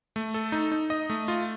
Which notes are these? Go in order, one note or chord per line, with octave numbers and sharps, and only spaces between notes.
A3
A4
D#4
D#4
D#5
A3
F4